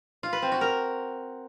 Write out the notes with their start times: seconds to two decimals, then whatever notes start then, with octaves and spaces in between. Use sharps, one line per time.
0.23 F4
0.33 B4
0.42 C4
0.52 F#4
0.61 A#4